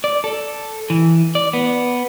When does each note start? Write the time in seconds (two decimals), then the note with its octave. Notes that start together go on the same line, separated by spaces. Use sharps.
0.04 D5
0.24 A4
0.90 E3
1.35 D5
1.53 B3